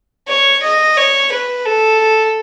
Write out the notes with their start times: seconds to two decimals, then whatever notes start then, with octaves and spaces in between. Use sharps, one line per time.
0.28 C#5
0.62 D#5
0.97 C#5
1.32 B4
1.66 A4